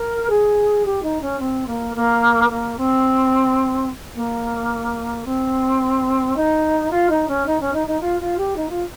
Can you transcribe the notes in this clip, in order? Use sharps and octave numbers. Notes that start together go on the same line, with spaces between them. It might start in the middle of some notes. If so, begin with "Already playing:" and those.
Already playing: A#4
G#4
G4
D#4
C#4
C4
A#3
A#3
A#3
C4
A#3
C4
D#4
F4
D#4
C#4
D#4
C#4
D#4
D#4
F4
F4
G4
D#4
F4